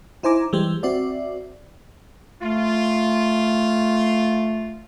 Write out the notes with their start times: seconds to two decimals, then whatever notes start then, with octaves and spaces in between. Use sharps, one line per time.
0.23 D#4 E4 C5 G#5 A#5 D6
0.53 E3 G3 G#3 G4 C5
0.83 C4 F#4 D5 E5
2.43 A3 F4